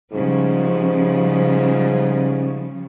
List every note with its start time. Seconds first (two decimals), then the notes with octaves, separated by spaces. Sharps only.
0.12 G#2 C#3 F3 G3